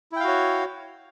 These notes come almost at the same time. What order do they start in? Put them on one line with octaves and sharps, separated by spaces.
E4 G5 F5 F#4 C#5